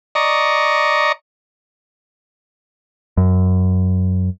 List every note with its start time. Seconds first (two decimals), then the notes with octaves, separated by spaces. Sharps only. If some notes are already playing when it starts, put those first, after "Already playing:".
0.15 D5 D#5 A#5 C#6
3.17 F#2